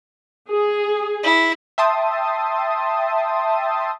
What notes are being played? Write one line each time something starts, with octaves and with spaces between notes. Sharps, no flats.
G#4
E4
E5 G5 A5 C6 D#6